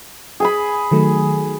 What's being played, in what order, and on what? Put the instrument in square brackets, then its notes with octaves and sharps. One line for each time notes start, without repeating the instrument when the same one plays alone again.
[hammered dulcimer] G#4 G#5 B5
[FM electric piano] D#3 F#3 A3